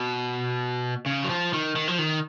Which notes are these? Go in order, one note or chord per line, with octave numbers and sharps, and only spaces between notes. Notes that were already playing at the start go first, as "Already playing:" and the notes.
Already playing: B2
C#3
F#3
F3
D#3
D#3
F3
D#3